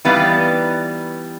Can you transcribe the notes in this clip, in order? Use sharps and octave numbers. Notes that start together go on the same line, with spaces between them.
E3 G3 B3 D#4 B4 F5